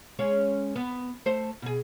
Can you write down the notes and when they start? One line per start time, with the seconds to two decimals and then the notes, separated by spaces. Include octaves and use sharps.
0.19 G#3 C#4 C#5
0.76 B3
1.26 A3 C5
1.62 B2 G#4